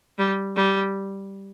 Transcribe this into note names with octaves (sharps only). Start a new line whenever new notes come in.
G3
G3